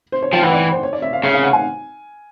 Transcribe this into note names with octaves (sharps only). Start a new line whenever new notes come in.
C5
C#5
F3 G5
E3 F#5
D5
C5
C#5
D5
E5
F5
C#3 E5
F5
F#5
G#5